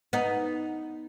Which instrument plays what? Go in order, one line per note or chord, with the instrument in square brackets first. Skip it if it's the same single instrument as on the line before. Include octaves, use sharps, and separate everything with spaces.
[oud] B3 D#4